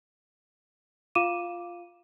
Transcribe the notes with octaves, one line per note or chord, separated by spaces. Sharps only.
F4 F5 D6 D#7 E7